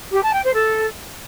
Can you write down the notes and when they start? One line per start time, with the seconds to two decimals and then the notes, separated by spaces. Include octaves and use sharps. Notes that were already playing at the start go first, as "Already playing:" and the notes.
0.11 G4
0.22 A5
0.32 G5
0.43 C5
0.53 A4